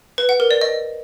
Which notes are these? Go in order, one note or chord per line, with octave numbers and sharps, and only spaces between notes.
B4
F#5
A#4
D5
D#5